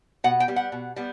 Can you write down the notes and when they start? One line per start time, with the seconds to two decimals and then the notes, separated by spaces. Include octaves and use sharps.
0.24 B2 F#5
0.40 G5
0.48 G3 B3
0.56 F#5
0.72 B2
0.96 G3 B3